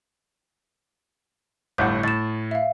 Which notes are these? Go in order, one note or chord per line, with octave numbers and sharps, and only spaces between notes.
G1 A2 F#5 G6
A2 A6 E7
E5 F5